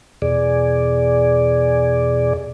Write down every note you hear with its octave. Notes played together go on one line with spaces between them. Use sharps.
E2 B2 G#4 D5